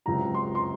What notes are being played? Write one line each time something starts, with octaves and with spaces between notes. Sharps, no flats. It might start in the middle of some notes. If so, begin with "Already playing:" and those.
C#2 C3 F#3 A#5
C6
C6